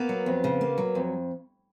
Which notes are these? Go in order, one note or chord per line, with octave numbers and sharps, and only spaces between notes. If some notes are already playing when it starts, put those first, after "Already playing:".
Already playing: A#3 B3
F#3
F2
C#3
A#3
F#3
F2